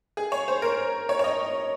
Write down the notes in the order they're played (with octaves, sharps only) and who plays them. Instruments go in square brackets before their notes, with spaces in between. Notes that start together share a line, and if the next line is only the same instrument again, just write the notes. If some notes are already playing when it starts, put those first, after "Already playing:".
[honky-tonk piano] G#4
C#5
C5
A#4
C#5
C#5
D#5